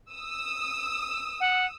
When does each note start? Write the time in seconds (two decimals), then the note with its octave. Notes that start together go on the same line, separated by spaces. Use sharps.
0.12 D#6 E6
1.40 F#5